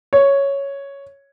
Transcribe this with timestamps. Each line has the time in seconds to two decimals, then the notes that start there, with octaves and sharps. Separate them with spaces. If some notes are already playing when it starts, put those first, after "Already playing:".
0.13 C#5